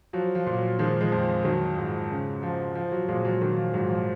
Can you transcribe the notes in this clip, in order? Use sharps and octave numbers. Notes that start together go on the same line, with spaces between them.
F3 F#3
F3
A#2
F#3
D#3 F3 G#3
F3 G#3
F2
F3
D#3 F#3
G#2
C#3
F3
F3
F#3
A#2 F3 G#3
F#3
D#3 F#3
F3
G#2 F#3
F3